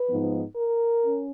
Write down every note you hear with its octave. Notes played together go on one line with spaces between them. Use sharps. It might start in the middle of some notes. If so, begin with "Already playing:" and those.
Already playing: B4
G#2 F3 B3 D#4
A#4
C#4